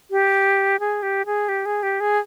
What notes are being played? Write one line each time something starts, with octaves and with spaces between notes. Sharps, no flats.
G4
G#4
G4
G#4
G4
G#4
G4
G#4